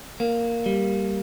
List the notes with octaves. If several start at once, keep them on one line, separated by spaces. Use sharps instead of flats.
A#3
G3